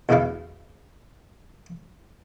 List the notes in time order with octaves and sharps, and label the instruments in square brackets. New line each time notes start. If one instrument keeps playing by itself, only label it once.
[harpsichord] E2 B2 D3 A3 E4 F5